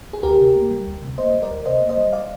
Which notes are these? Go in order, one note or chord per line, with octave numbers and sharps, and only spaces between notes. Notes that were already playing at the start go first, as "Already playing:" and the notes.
G#4
D2 G4 A#4
C3
A#3
G3
D2
C3
A#3 C5 D#5
G3
A#4 D5
D2
C3 C5 D#5
A#3
C5 D#5
G3
D5 F5